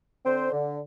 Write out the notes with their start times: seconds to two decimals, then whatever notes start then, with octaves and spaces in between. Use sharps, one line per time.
0.25 D3 C4 C5
0.52 D3